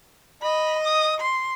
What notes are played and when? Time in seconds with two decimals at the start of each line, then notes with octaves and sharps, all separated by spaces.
0.42 D#5 B5
0.84 D#6
1.20 C6